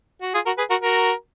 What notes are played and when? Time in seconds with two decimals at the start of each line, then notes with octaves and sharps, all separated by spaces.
0.22 F#4
0.34 F4 G#4
0.46 F#4 A#4
0.58 G#4 B4
0.70 F#4 A#4
0.82 F#4 A#4